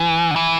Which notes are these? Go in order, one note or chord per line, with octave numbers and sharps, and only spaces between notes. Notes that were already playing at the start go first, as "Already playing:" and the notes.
Already playing: E3
D3
E3